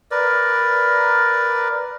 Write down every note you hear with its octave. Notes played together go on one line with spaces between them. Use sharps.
A#4 B4 D5